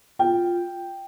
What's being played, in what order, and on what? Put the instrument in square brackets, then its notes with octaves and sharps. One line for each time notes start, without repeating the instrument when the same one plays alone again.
[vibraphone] F4 [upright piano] G5